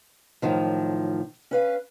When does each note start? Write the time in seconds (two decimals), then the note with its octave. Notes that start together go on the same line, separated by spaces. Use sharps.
0.42 F#2 A2 D#3 F3
1.51 C#4 B4 F5